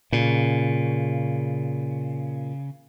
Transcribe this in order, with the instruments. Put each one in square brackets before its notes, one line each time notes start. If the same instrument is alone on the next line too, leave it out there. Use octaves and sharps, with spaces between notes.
[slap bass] A#2 [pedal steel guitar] C#3